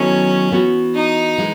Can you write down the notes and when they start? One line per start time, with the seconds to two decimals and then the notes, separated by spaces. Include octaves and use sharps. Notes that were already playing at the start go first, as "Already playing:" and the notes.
Already playing: D#3 F#3 B3 C#4 E4 A4
0.52 E3 B3 F#4
0.94 D#4
1.38 E3 G#3